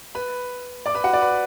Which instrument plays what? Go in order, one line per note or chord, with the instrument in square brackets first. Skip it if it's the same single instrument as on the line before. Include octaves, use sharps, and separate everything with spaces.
[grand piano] B4 B5
D5 D6
B4 B5
F#4 F#5
D5
B4